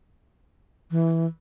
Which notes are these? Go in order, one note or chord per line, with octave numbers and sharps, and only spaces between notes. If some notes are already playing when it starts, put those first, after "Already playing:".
E3